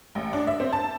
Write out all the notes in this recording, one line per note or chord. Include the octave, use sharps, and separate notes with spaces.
A1
D4
E5
C4
A5